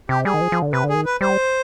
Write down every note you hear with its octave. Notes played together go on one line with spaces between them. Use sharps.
C3 G4
G3 G#4
D#3
F3
F3
D3
C3 B4
D3
D#3 G#4
B4
G3 C5